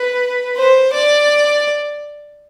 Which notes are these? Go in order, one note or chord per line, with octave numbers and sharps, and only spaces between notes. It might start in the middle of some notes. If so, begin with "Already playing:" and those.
Already playing: B4
C5
D5